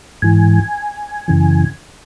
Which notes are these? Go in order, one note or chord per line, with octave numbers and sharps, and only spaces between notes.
G#2 E3 G#5
F#2 C#3 E3